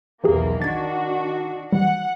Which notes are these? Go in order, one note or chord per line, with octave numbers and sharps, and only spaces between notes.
B1 E2 E3 A#3 G4 G#4
D#3 D4 F#4 G#6 A6
E3 G3 F#5